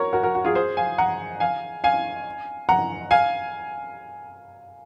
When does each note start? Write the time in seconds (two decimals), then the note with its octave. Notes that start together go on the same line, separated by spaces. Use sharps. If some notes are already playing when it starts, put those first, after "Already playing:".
Already playing: F#4 A#4 C#5
0.13 F#4 A#4
0.23 F#4 A#4
0.35 F#4
0.45 F4 G#4
0.55 G#4 C5
0.77 F5 G#5
0.98 F#5 A#5
1.40 F5 G#5
1.84 F5 G#5
2.69 F#5 A#5
3.11 F5 G#5